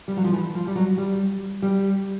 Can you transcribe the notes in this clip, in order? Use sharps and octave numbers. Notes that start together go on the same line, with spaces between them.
G3
F#3
F3
E3
F3
G3
F#3
G3
G3